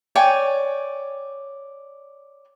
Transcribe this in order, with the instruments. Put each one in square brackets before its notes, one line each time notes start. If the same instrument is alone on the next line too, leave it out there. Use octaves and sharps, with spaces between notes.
[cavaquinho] C#5 D5 G5 G#5